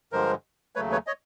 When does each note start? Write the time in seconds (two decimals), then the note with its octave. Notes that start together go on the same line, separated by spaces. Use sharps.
0.12 G2 D3 F3 G#3 A#4 C5
0.76 D#2 C#3 F#3 A3 B4 C#5
0.92 B4 C#5
1.07 C#5 D#5